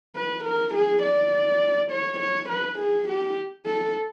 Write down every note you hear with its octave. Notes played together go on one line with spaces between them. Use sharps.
B4
A#4
G#4
D5
C#5
C#5
B4
G#4
G4
A4